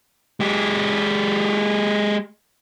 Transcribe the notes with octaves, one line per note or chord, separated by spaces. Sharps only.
G#3 G4